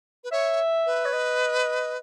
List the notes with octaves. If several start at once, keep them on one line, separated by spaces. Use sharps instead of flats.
B4
C#5 E5
B4
C#5
D#5